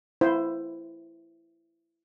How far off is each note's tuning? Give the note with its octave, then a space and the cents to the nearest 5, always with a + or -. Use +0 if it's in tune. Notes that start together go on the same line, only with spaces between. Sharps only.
E4 +15 C5 +0